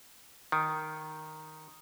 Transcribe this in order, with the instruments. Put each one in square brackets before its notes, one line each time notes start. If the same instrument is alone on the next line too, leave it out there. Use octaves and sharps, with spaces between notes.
[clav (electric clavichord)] D#3